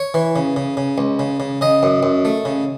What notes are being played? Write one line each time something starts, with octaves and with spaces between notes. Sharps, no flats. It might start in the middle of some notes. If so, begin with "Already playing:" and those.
Already playing: C#5
E3
C#3
C#3
C#3
C#2
C#3
C#3
C#3 D#5
F#2
F#2
A3
C#3